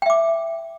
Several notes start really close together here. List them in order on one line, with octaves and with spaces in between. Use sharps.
G5 E5 D6